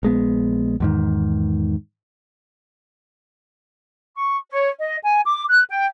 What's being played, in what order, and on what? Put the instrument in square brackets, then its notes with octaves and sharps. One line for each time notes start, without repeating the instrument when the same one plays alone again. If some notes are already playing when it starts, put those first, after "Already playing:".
[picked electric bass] A#1 G#3 B3
E2 G#2 D#3
[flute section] C#6
C#5
D#5
G#5
D6
F#6
G5